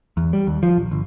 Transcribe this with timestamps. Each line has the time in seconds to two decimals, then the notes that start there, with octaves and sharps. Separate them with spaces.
0.17 E2
0.33 G3
0.47 D#2
0.63 F3
0.76 A#1
0.91 G1